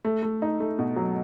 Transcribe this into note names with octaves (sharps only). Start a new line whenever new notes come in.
A3
A3
D#4
A3
B2
F#3